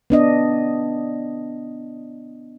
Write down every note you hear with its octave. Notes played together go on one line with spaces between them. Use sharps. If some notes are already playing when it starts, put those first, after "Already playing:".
B3 D4 D#5